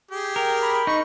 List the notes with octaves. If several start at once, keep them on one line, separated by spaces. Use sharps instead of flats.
G4 G#4
A#4 G5
B5
D#4 C#6